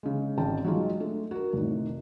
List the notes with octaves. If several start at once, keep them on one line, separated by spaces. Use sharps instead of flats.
C#3 G#3
G#1 G#3 C#4 G5 A5
F#3 G#3 D#4 F4
A3 D4
F#4 A#4
F1 A2 D#3